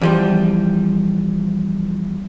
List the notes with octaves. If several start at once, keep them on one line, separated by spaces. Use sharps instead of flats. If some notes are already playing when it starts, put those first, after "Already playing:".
E2 F3 G3